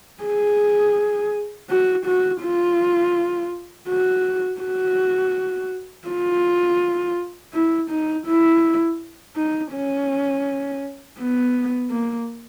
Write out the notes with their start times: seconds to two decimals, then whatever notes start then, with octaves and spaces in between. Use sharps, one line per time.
0.24 G#4
1.70 F#4
2.06 F#4
2.42 F4
3.89 F#4
4.61 F#4
6.07 F4
7.54 E4
7.90 D#4
8.27 E4
9.36 D#4
9.73 C#4
11.19 B3
11.91 A#3